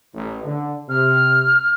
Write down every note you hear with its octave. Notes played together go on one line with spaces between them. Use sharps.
A1
D3
C3 F6